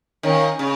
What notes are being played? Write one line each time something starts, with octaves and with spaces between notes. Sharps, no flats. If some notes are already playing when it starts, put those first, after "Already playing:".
D#3 C#4 A#4 F5 G#5
C#3